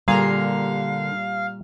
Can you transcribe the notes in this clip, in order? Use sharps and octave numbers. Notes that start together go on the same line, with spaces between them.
A#2 D3 G3 A#3 G#4 A#4 F5